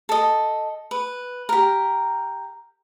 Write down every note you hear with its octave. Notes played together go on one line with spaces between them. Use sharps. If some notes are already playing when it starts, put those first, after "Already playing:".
A4 D#5
B4
G4 A#4